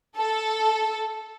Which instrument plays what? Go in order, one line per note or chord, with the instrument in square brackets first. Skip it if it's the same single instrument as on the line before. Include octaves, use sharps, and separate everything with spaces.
[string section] A4